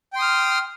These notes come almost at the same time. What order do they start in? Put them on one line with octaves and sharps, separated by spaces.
G5 C6 D#6 F6